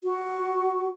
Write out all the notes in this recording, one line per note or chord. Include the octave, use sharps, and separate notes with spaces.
F#4